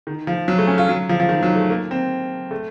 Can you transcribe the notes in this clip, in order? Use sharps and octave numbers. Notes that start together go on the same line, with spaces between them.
D#3
F3
F#3
A3
C#4
F4
F#3
F3
F3
D#3
F#3
A3
A#3
C4
A3